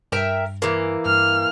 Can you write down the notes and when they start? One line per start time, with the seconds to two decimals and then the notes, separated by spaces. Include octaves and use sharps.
0.12 G2 A#4 E5 G5
0.62 E3 A#3
1.06 G2 F6